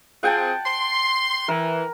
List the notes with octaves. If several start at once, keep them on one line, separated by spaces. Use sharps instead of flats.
C4 F4 G#4 F#5 G5 A5
C6
E3 A#4